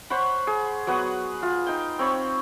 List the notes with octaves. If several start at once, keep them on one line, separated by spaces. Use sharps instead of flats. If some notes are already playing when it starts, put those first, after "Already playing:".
C5 C#5 F#5 B5
G#4
F#3 B3 F#5 D#6
F4
D#4 G5
C4 C#5 B5